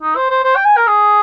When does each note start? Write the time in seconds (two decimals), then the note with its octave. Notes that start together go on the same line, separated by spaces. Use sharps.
0.03 D#4
0.16 C5
0.30 C5
0.44 C5
0.56 G5
0.65 G#5
0.77 A#4
0.87 G#4